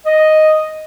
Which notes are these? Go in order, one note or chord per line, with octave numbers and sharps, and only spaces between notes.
D#5